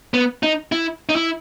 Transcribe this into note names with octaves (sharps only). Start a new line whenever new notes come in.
B3
D#4
E4
D#4
E4